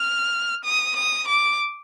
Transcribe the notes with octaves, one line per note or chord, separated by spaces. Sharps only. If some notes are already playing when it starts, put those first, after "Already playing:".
Already playing: F6
D#6
D#6
D6